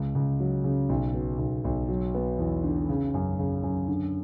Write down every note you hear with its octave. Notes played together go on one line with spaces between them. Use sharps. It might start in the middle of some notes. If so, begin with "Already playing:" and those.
Already playing: C#2
C#2
F#3
C#3
B1
B2
B1
B1
F#3
B3
E2
D3
C#3
F#2
C#3
F#2
D3